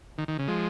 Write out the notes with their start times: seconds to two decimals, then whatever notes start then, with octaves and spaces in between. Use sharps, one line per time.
0.18 D#3
0.28 D#3
0.39 C#3
0.48 F3 G#3